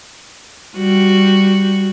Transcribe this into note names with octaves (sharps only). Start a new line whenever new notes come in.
G3 F#4